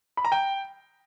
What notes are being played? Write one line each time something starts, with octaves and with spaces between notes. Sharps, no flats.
B5
A#5
G5